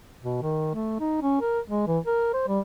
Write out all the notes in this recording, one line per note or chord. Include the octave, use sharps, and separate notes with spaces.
B2
D#3
A3
D#4
C#4
A#4
G#3
E3
A#4
C5
G3